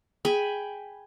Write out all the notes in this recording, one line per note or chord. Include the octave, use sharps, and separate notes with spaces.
G#4 G5 G#5 B5